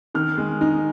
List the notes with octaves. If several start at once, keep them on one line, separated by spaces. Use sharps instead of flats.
D#3 F6
G#3
D#4